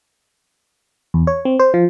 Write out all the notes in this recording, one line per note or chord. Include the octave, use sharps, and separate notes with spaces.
E2
C#5
C4
C5
F3